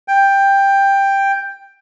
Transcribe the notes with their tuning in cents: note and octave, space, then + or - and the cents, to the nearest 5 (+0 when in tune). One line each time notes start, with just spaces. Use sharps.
G5 +10